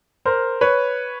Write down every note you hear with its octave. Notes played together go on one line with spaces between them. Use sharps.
A#4 C5
B4 C#5